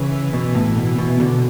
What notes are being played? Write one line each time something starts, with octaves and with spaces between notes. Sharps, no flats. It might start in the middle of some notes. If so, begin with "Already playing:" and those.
Already playing: C#3 E3
B2
A2
B2
B2
B2 D3